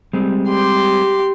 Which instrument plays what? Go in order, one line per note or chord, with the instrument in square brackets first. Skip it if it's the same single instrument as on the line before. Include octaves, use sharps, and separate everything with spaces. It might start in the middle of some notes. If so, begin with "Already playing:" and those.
[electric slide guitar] G3 G#3 C4
[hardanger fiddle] G4 C6